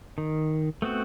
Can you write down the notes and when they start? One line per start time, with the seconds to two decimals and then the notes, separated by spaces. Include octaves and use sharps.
0.18 D#3
0.82 A3 B3 C4 F#4